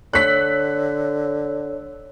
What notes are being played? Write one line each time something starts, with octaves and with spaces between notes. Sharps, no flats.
D3 C#5 E6 F#6 B6